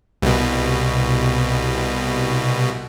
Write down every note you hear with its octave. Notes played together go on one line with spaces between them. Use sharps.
C2 B2